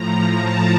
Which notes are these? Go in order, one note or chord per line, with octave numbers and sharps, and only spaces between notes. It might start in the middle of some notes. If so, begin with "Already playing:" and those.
Already playing: A2 F3 A#5
A5